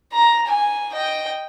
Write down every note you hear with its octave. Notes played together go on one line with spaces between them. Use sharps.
A#5
G#5
D#5 G5